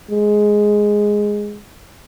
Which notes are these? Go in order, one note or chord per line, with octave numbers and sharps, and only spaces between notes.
G#3